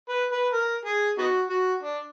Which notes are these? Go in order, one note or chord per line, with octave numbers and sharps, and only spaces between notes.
B4
B4
A#4
G#4
B3 D#4 F#4
F#4
D4